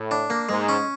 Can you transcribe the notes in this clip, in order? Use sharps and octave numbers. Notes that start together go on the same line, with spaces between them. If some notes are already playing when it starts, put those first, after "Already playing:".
Already playing: A2
D4
A#3
G#2 G#3
C#4